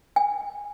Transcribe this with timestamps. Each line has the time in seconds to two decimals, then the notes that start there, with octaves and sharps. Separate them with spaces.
0.16 G#5